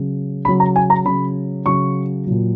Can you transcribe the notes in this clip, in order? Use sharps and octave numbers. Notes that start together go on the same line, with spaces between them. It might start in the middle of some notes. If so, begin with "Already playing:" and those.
Already playing: C#3 F#3
C#3 F#3 B5
A#5
G#5
A#5
C#3 F#3 B5
C#3 F#3 C#6
A#2 F#3